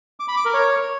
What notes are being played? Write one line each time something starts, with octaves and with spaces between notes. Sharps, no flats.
D6
B5
D6
A#4
C#5